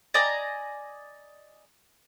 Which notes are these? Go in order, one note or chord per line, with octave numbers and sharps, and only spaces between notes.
D5 D#5 G#5 A#5